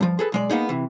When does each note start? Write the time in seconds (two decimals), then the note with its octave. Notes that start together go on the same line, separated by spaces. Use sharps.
0.01 G2 F3
0.19 G#4 A4 B4
0.32 B1 G#3 D5
0.49 A#3 B3 D#4 G#4
0.69 C3 E3